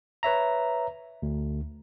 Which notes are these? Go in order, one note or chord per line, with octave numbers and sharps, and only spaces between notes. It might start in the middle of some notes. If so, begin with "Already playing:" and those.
B4 C#5 E5 A#5
D2